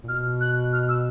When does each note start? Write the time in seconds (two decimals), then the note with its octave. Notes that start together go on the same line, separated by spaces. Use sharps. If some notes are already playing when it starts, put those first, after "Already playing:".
0.03 A#2
0.07 B2 F6
0.41 F#6
0.73 F6
0.89 E6